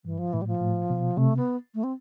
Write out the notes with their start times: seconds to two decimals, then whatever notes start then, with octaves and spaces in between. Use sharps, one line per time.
0.05 G2 E3
0.19 F3
0.33 A2 E3
0.42 G3
0.47 F3
0.61 A2
0.90 B2
1.17 C3 A3
1.37 B3
1.75 A3
1.84 C4